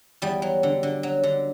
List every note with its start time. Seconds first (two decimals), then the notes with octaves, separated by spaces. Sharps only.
0.22 E2 G3
0.42 F#3
0.63 D3
0.83 D3
1.03 F#3
1.23 D3